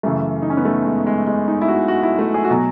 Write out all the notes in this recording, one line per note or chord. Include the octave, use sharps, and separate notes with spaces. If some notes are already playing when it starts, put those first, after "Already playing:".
F#2 C#3 E3 A3
D#4
C#4
B3
A3
G#3
G#3
G#3
D#4
E4
F#4
F#4
E4
A3
G#4
F#4
B2 F#3 G#4